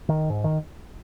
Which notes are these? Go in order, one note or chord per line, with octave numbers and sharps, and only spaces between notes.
D#3
G#2
D#3